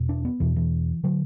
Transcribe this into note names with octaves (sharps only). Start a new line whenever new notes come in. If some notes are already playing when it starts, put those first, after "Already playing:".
Already playing: E2 B2
D4
B3
E2 B2 E3
E3
D3 F#3